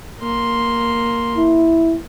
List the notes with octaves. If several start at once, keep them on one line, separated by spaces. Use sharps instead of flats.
A#3 C6
E4